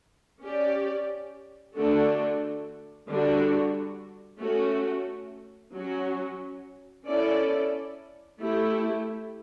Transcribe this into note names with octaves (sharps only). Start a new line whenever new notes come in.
C#4 G4 D5
D3 A3 D4 F#4 A4
D3 G3 D4 F#4
A3 C#4 F#4
F#3 C#4 F#4
C#4 E4 A4 D5
A3 E4 G4